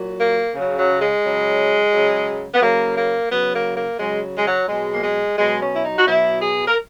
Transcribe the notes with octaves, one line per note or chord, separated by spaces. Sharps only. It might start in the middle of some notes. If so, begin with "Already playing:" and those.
Already playing: A#2 F#3
A#3
C#3 F#3
F#3
G#3
C#3 F#3
C#3 F#3
B3
C#3 F#3 A#3
A#3
C#3 F#3 B3
A#3
A#3
C#3 F#3 G#3
G#3
F#3
B2 F#3 G#3
A#3
G#3
B2 F#3 G#3
C#4
E4
D#4
F#4
B2 F#3 E4
G#4
A#4